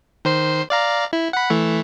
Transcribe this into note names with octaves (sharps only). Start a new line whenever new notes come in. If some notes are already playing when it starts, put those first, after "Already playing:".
D#3 C5 C7
D5 F5 A#5
E4
F#5 B5
E3 A3